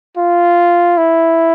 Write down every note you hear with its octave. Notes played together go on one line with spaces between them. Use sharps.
F4
E4